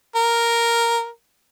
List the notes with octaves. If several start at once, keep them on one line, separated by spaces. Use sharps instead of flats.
A#4